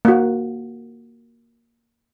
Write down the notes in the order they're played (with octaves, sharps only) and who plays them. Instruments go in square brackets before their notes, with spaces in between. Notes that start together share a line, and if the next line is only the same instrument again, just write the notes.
[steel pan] A#3 F#4